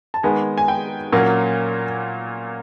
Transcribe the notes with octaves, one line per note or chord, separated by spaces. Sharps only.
A5
D#3 G#3 B3 G#5
G#5
G5
A#2 F#3 A#3 C#4